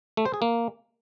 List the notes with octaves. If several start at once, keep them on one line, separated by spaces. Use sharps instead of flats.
A3
C5
G#4
A#3